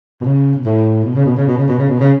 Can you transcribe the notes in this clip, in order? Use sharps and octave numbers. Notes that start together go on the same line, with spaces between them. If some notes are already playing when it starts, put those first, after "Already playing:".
B2
C#3
B2
A2
B2
C#3
B2
C#3
B2
C#3
B2
C#3
B2
C#3